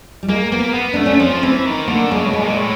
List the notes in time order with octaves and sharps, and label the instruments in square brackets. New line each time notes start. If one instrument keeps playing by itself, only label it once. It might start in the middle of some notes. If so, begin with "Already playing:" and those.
[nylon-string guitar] G3
[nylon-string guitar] G#3 [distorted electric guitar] A#3
[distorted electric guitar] A#3 [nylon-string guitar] B3
[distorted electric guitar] B3
[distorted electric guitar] A3 [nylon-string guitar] D4
[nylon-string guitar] C#4
[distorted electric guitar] F3 [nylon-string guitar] C4
[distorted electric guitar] E3 [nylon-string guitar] C4
[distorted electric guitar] D#3
[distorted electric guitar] D3 [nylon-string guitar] A#3
[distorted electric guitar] C#3 [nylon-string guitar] G#3
[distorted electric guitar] B2
[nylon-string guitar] G#3
[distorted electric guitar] A#2
A2